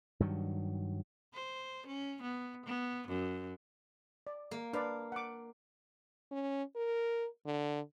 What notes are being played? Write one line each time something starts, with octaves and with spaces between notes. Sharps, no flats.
G2 D#3 F#3
C5
C#4
B3
B3
F#2
D5
A#3
D4 B4 D5 F5
F#5 D6
C#4
A#4
D3